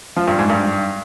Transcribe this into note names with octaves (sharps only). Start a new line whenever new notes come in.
F3
G2
G#2
G2